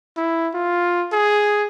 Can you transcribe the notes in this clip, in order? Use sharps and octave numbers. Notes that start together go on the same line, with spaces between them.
E4
F4
G#4